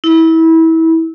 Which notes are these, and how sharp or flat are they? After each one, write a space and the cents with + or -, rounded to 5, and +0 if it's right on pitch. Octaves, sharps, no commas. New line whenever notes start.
E4 -25